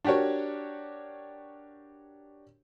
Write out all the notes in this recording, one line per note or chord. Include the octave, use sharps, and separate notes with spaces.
D4 F#4 G4 A#4 C#5